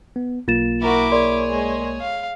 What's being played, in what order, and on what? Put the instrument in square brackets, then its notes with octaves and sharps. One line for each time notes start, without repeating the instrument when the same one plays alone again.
[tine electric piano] B3
[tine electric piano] B1 A#3 [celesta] F4 A6 E7
[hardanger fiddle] E4 D6 [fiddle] F#4 A#4
[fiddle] G#4 C#5 [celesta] A#4 D5 C6
[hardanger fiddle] G#3
F5